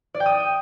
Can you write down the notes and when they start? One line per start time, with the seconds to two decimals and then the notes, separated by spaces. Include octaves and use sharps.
0.14 D5
0.20 G5
0.26 D#6